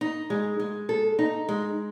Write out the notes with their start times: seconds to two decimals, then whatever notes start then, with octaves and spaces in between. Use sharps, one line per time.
0.01 D#4
0.30 G#3
0.60 G#3
0.89 A4
1.19 D#4
1.49 G#3